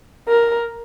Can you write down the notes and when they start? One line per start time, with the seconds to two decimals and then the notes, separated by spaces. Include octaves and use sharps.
0.28 A#4